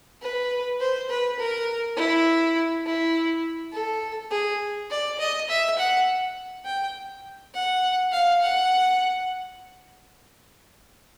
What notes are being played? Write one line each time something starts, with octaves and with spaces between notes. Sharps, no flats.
B4
C5
B4
A#4
E4
E4
A4
G#4
D5
D#5
E5
F#5
G5
F#5
F5
F#5